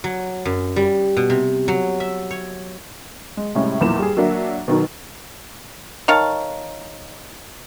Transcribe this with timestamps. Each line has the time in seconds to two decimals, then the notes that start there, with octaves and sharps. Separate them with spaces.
0.04 F#3
0.45 F#2
0.76 G3
1.17 B2
1.30 C3
1.68 F#3
2.00 E5
2.31 C#5
3.37 G#3
3.55 A2 C3 G3 G#3 C#4
3.81 B1 E2 A#2 F3 E4 E7
3.99 G3 G#4
4.17 F#3 A#3 D4 E5 F#5
4.68 B2 D#3 F#3
6.08 D#3 C#5 F5 A5